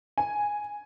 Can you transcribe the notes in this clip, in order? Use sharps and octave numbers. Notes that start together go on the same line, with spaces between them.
G#5